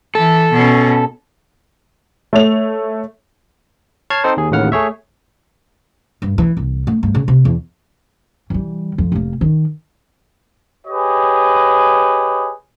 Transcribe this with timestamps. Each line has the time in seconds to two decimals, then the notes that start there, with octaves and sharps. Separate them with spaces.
0.15 E3 A4
0.52 B2 C#4
2.33 A3 C#5 F7
4.10 C#5 A5 F6 G#6 C7
4.24 C4 D#4 A4 C5
4.37 D#2 G#4
4.51 A1 D#2 A2 C#3 F#5 F6
4.72 A3 G#4 C#5 E5
6.22 G2
6.38 E3
6.57 C2
6.87 A3
7.03 G2
7.15 C#3
7.28 C3
7.45 E2
8.50 E3 G3
8.98 F2
9.12 F1 A#3
9.41 D#3
10.87 G4 G#4 B4 C#5 D#5